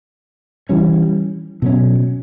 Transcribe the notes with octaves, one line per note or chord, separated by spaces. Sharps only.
E3 G3 C#4
B2 F#3 C#4